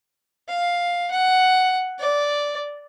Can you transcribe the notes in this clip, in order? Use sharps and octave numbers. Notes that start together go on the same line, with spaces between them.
F5
F#5
D5